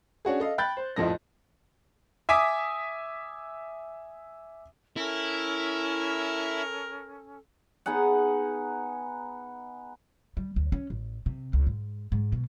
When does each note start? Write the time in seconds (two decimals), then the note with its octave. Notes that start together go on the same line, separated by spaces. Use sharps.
0.25 C#4 D4 F#4 G#4
0.40 A4 D#5 F5
0.58 G5 B5 F#6 G6 A6
0.77 C5
0.96 A#1 F2 A2 F3 D#5 A#6
2.29 E5 G#5 D6 D#6 B6
4.97 C#4 E4 A4 A#4
7.86 B3 D#4 G#4 F#5
10.37 G3
10.56 D2
10.72 C#4
10.90 A1
11.26 C3
11.53 C#2
11.67 G#2
12.12 G#2
12.32 B2